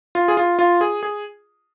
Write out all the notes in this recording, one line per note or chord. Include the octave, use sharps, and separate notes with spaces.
F4
G#4
F4
F4
G#4
G#4